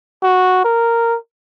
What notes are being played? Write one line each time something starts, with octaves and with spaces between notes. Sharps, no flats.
F#4
A#4